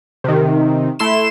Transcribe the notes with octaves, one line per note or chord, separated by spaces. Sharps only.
C3 D#3
A3 E4 C6 E7